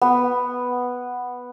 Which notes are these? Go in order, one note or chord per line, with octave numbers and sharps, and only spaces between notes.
B3